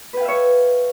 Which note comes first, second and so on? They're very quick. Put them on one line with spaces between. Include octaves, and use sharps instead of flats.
B4 G5 F5 E5 C#5